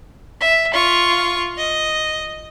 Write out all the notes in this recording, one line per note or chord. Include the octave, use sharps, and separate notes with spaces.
E5
F4 C#6
D#5